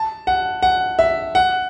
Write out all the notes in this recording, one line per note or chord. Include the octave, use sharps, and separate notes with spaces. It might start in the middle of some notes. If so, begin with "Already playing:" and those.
Already playing: A5
F#5
F#5
E5
F#5